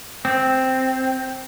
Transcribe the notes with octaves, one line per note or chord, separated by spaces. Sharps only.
C4